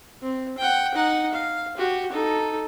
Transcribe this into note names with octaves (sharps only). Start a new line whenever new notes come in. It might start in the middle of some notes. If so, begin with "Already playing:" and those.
C4
F#5 G5
D#4 F#5
F5
F#4 G4
D#4 A4